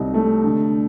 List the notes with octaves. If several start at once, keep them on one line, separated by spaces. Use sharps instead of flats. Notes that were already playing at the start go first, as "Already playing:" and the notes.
Already playing: C2 D#4
A3
D3